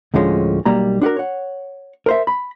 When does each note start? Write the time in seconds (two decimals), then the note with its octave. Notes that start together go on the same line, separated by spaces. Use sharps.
0.14 D2 A2 D3 F3 G#3 C#4
0.65 B1 G3 A#3 A#5
1.01 D4 F#4 G4 A#4
1.16 C#5 F#5
2.06 A#4 C5 E5
2.27 B5